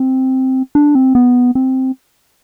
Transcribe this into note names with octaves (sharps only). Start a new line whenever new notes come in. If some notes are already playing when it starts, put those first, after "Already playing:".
Already playing: C4
D4
C4
B3
C4